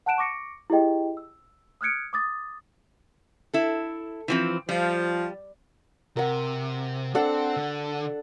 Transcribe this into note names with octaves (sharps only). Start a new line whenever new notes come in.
F#5 A5 F#6 D7 E7
C#6 D6 A#6 C#7 D7
E4 G4 G#4 D#5 G5
E6
D#6 F6 F#6 G#6 C#7 D7
D6 D#6 A6
E4 A4
E3 F3 C4
F3 G3
C3 A#4 F#5
C4 D4 A4 F#5
D3